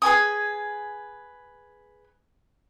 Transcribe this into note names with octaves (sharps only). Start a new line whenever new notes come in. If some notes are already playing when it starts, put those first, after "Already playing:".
G#4 B4 G#5 D#6